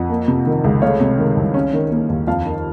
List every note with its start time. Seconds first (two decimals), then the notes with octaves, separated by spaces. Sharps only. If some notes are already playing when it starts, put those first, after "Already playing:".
Already playing: F2 F#5
0.10 A#3
0.28 C3
0.46 D#3
0.64 C#2
0.82 A3 C#5 F5
1.00 C3
1.19 D#3
1.37 C2
1.54 C#4
1.73 D#3
1.91 A#3
2.09 D#2
2.27 F2 F5 A5
2.45 D#3